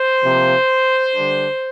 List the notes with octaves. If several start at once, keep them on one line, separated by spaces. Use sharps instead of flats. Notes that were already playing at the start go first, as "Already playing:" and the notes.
Already playing: C5
C3 F3 A#3
D3 G3 D4